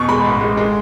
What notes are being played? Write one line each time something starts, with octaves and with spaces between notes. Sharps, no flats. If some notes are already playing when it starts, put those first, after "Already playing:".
Already playing: E2 B2 C#6
G#3 B5
A1
G#3
G#3